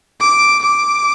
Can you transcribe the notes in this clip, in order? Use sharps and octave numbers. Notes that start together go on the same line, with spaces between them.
D6
D6